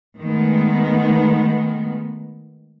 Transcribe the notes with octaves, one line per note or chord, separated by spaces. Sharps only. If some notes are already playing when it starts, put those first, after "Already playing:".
D#3 G#3 A3 B3